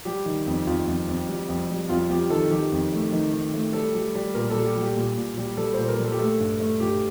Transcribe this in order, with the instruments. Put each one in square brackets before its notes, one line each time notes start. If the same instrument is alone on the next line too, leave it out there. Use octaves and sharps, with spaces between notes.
[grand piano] G3 G4
D#3
F2
F2 F4
F2
F2
G3
F2
G3
F2 F4
F2 G4
D#3 A4
D#3 G4
F2
A3
D#3
D#3
A3
G3 A4
G3
G3
A#2 A#4
A4
G3
G4
G3 G4
A#2
A#2
G3
G3 A4
C5
A#2
A#4
G3
A4
G4
A3 A4
G2
A3
G2 G4